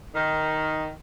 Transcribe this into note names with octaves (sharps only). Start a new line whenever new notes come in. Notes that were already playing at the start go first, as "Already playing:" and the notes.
D#3